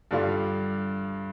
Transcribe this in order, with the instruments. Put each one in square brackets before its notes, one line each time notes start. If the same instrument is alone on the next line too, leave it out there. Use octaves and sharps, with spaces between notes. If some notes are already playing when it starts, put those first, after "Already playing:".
[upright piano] G2 D3 G3 D4 F4